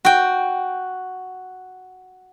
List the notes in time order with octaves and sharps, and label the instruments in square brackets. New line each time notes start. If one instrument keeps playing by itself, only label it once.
[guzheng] F#4 G5